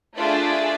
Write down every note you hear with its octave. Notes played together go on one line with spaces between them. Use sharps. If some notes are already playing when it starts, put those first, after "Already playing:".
A3 D4 F4 G#4 D5 E5